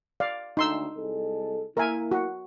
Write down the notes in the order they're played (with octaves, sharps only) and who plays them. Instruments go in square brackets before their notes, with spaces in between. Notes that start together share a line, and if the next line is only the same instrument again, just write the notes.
[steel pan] D5 F5
[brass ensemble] D2 [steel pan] D#4 C6 E6
[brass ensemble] C2 G#3 A4
[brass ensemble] A#3 E4 [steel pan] A#4 E5 G#5
[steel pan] F#4